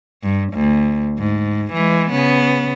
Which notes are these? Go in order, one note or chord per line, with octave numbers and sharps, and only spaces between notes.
G2
D2
G#2
E3 G#3
C#3 B3